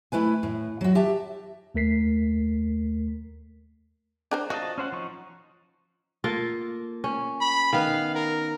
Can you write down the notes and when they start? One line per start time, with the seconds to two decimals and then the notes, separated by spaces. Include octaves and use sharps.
0.12 A3 E4 B4 G#5
0.43 A2
0.81 F#3 F#4
0.95 G4 E5 A5
1.74 D#2 A3 A#4 B6 C7
4.31 D4 A#4 C5
4.50 F3 F#4 D#5 A5
4.78 C#4 C5 F#5
4.92 F3 D#4 C#6
6.24 A#3 F4 A4
7.04 C#4
7.41 B5
7.73 D#3 B3 F5
8.15 A#4